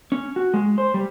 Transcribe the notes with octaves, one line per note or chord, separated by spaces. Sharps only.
C#4
F#4
G#3
C5
G3